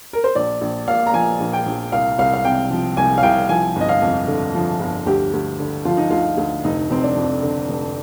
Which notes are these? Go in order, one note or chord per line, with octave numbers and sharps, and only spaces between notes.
A#4
C5
A#1 D5
A#1
A#2 F5
A#5
F3 G#5
A#1
G5
A#1
C2 F5
C2 F5
F5
C3 G5
F3
C2 G#5
F5
C2 G5
F3 G#5
G1 D#5
F5
F2
D3
F3
G1
D2 G4
D2
D3
F3 F4
D#4
D2 F4
D2
F1 D#4
F1 C4
D4
F2
D3
F1